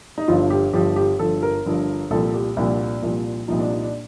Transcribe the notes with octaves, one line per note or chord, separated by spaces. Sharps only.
D#4
G1 G2 F3 F4
G4
G1 G2 F3 G4
G4
G1 G2 F3 A4
A#4
G1 G2 F3
C2 A#2 F3 A4
G4
C2 A#2 F3 D4
C2 A#2 F3
C2 A#2 F3 D#4
D4
D#4
D4